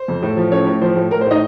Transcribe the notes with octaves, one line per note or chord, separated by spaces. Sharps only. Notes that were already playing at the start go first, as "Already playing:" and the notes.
Already playing: C5
F2
A2
F3
A2 C#4 C#5
A2
F3 C5
A2
A2 A#4
C5
A2 D#4 D#5